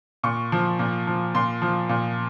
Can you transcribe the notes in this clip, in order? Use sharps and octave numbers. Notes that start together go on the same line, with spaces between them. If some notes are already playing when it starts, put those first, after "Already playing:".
A#2 C#6
F3
A#2
F3
A#2 C6
F3
A#2